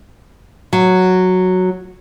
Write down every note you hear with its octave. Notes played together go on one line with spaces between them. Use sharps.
F#3